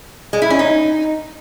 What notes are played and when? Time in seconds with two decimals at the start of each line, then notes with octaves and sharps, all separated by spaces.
0.33 G#3
0.42 E4
0.50 C#4
0.59 D#4